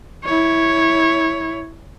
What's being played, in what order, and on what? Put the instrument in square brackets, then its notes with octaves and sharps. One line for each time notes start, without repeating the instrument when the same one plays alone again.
[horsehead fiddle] E4 C#5